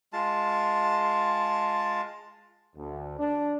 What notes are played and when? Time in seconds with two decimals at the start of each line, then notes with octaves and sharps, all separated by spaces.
0.13 G#3 F4 A5
2.76 D2
3.18 D4